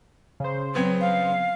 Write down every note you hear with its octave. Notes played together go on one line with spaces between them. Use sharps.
C#3 C5
F#3 B3 C4 G#6
F5